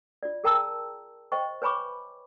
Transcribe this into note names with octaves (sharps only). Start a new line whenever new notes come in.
F4 D5
G#4 A#4 G5 A5 A#5 E6
C5 D#5 G5 C#6
B4 C#5 G#5 B5 C#6 D6